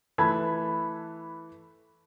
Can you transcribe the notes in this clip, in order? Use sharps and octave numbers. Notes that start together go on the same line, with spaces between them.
E3 A3 B4 A5 B5 G#6